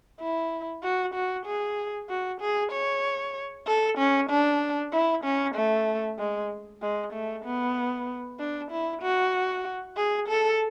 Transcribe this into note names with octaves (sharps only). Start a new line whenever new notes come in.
E4
F#4
F#4
G#4
F#4
G#4
C#5
A4
C#4
D4
E4
C#4
A3
G#3
G#3
A3
B3
D4
E4
F#4
G#4
A4